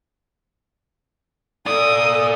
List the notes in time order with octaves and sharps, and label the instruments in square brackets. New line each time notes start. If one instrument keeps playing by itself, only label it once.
[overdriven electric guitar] F4 D5 [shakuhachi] A4 [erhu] D#6